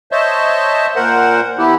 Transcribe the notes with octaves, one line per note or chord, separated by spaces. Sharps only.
C5 C#5 D#5 E5 A5
A#2 A#4 C5 F#5
E3 B3 E4 G4